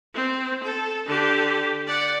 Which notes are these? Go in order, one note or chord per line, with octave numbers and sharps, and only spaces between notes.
C4
A4
D3 G4
D5 F#5